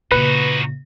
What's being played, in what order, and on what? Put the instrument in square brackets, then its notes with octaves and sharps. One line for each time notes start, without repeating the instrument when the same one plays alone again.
[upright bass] A#2 C#3 [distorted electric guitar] D#4 F#4 [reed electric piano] B4